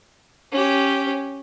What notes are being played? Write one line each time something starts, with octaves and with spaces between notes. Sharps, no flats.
C#4 G4